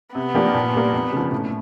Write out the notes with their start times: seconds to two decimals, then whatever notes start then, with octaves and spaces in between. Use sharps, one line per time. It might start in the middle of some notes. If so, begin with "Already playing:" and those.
0.15 C3 B3
0.34 F3 A#3 D4 G4
0.54 A#2
0.74 G3 A#3
0.93 F2
1.12 C#3 F3
1.31 A2